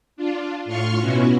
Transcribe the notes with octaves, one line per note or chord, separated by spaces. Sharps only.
D4 F4
A2 F4 C6 C#6 F6
B2 B3 C#4 E4 F#4